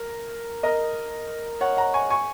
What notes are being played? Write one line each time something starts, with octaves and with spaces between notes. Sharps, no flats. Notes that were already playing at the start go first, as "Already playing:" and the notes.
Already playing: A#4
A#4 D#5
C#5 F#5
F#5 A#5
G#5 C#6
G#5 C#6